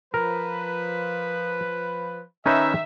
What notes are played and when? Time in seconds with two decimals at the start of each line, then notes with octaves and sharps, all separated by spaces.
0.14 F3 A#4 B4
2.46 D#3 C#4 D#4 B4 E5